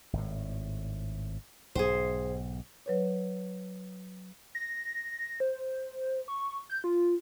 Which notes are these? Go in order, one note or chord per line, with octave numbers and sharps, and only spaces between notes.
G#1 A2
B1 G#2 G#4 C5
F#3 B4 C#5
A#6
C5
C#6
G6
F4